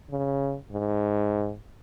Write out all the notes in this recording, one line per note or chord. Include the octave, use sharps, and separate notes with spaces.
C#3
G#2